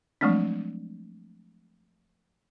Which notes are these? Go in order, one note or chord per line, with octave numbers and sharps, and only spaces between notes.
F3 F#3 G#3 A3 C4 D4